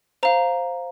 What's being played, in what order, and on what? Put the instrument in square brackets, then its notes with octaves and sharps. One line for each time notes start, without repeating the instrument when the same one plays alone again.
[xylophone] C5 F5 A#5